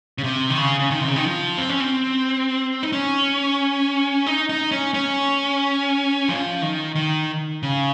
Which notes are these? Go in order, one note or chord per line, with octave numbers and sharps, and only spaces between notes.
C#3
C3
D#3
C#3
C#3
D#3
C3
C#3
D#3
F3
C4
C#4
C4
D#4
C#4
D#4
D#4
C#4
C#4
F3
D#3
D#3
C#3